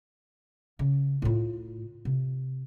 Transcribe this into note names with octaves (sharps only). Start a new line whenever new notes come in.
C#3
A2 F4
C3